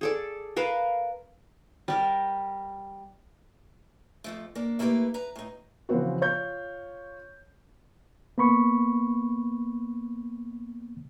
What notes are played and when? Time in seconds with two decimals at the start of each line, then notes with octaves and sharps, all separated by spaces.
0.01 G#4 A4 D5
0.56 A#4 B4 F5 A5
1.88 G3 G4 A#4
4.24 F2 F3 A3
4.55 A#3 D4
4.79 A3 A#3 D4 E4 G4 B4
5.14 B4 A#5
5.36 A2 D#4
5.89 C#3 E3 F3 C4 F#4
6.21 F4 C#5 G6
8.38 A#3 B3 B5 C#6